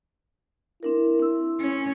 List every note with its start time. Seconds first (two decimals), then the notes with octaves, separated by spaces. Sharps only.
0.83 C4 D4 E4 A#4
1.20 C4 E6
1.60 C#4